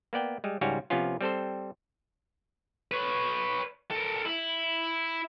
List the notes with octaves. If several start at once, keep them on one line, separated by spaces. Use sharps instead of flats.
A#3 B3 D5 G5
G3 G#3
C#2 G#2 G3 C#4 F#4 F5
C3 F3 B3 C#4 F4
G3 C4 A4 C5
B4 C#5
A4 A#4
E4